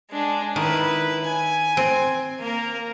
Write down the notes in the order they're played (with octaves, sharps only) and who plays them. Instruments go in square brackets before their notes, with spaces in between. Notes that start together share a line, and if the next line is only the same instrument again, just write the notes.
[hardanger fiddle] G#3 D4
[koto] D#3 [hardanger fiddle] E4 B4
[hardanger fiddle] G#5
[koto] C4
[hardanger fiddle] A#3 A#4